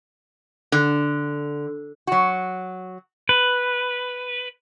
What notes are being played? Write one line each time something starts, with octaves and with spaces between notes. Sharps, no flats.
D3
F#3 F#4
B4